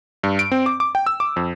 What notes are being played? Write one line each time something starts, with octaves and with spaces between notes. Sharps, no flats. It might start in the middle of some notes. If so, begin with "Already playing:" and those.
G2
D7
C4
D6
D6
G5
E6
D6
F2